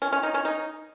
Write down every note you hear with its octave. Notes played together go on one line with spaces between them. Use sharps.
C#4
C#4
D#4
C#4
D#4